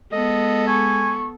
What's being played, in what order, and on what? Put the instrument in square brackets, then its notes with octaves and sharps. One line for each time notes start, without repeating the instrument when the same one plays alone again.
[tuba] G#3 [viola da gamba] B3 A4 [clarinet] D#5
[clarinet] G#5 [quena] C#6